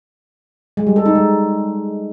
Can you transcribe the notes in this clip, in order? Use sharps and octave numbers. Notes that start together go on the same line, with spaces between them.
G#3
G3
A4
D#4
G#3